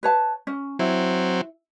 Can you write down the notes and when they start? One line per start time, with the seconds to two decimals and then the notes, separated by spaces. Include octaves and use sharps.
0.03 B4 C#5 A5
0.47 C#4
0.79 F#3 C4 E4